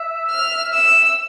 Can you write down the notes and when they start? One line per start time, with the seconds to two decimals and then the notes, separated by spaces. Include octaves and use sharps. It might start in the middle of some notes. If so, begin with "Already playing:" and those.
Already playing: E5
0.30 F6
0.73 E6